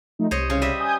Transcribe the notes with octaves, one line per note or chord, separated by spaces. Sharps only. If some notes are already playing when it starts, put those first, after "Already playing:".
F3 A3 D#4
C2 C5 C#5 D#5
C#3 C5
G3 D#5 E5
G#5 D#6 G6